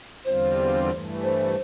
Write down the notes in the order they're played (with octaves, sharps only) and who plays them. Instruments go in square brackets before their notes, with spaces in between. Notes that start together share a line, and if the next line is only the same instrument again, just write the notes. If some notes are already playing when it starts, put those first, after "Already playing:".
[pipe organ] E2 D3 G3 C4 F4 [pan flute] C5
[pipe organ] G2 E3 A3
[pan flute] C5